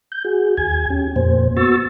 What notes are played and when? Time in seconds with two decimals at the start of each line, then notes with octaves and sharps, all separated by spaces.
0.12 G6
0.25 F#4 G#4
0.57 D#2 G#5 G#6
0.90 C#4 G4
1.16 F2 A#2 A#3 C5
1.57 B3 F#4 C#6 E6 A6